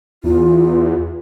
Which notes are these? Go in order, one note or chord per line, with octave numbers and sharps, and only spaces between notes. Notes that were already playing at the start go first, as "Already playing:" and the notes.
E2 F4